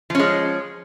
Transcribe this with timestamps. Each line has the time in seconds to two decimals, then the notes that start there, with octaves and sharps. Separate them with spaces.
0.10 F3
0.15 C#4
0.19 G#3